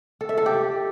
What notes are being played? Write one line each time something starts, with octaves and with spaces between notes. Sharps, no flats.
A4
E5
A4
G4